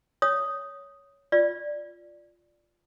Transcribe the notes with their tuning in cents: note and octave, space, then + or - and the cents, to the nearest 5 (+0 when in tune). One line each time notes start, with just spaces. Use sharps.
C#5 +10 D#6 +0
F4 +0 D5 +0